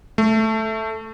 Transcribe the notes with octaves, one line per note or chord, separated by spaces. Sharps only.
A3